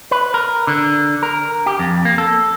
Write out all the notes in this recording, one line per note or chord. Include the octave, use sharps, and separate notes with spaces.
B4
A#4
D3
A#4
G4
F2
A#3
A4